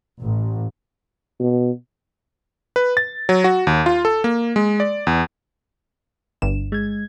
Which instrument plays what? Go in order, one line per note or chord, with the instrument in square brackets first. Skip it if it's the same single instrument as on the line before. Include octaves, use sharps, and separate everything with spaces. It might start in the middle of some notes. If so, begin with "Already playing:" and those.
[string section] A1
[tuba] B2
[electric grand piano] B4
A6
F#3
F#4
D#2
F4
A4
A#3
G#3
D5
E2
[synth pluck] G1 G2 E7
[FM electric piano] G#3 G#6